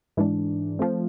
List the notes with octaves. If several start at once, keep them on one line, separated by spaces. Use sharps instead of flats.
G#2 E3 G#3 D4
F3 A3 C4